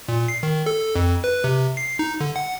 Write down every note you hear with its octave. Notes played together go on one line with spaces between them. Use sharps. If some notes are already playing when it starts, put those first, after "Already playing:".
A#2
C7
D#3
A4
F2
B4
C3
C7
D#4
D3
F#5